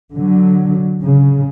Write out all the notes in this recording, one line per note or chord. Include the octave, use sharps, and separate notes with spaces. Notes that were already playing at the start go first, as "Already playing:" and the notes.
D3 F#3
C#3